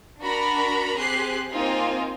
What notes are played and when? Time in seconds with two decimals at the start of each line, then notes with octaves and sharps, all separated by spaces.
0.21 D4 F#4 A#4 A#5 B5
0.95 C4 G4 G#4 F#6 C7
1.50 A#3 C4 D#4 F4 G#5